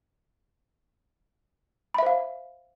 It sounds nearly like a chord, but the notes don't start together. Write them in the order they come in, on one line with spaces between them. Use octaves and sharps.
B5 E5 C5 F5